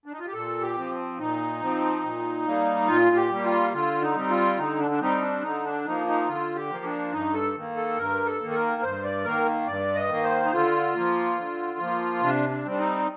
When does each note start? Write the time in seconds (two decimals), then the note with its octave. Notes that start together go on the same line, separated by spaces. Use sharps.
0.06 D4
0.12 D#4
0.19 F4
0.27 G4
0.33 A#2 A4
0.61 G4
0.77 F3 C4
1.18 A#2 D#4
1.61 F3 C4
2.03 A#2
2.46 G3 A#3
2.88 A#2 F4
3.16 G4
3.31 G3 A#3
3.44 F4
3.73 D3 F4
4.01 D#4
4.15 G3 C4
4.30 F4
4.57 D3 D#4
4.80 D4
4.91 D4
5.01 G3 C4 D#4
5.21 D4
5.42 D3 D#4
5.65 D4
5.85 F3 A#3 D#4
6.07 D#4
6.27 D3 F4
6.55 G4
6.71 F3 A#3
6.84 D4
7.12 G2 D#4
7.33 A4
7.55 D#3 A#3
7.76 A4
7.97 G2 A#4
8.26 A4
8.40 D#3 A#3
8.50 A4
8.55 A#4
8.82 G2 C5
9.04 D5
9.25 D#3 A#3 A#4
9.67 G2 D5
9.95 D#5
10.09 D#3 A#3
10.24 C5
10.45 D#4
10.52 D3 F4
10.95 F3 A#3
11.37 D3
11.79 F3 A#3
12.22 C3 D4
12.50 D4
12.64 G3 C4
12.71 D4
12.78 D#4